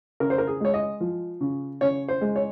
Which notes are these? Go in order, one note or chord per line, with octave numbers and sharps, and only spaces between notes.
C#3 A#4
C5
A#4
G#4
G#3 C#5
D#5
F3
C#3
C#3 C#5
C5
G#3
C#5